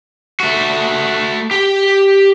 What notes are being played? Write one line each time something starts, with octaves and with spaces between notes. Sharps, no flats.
A3 F#4
G4 G5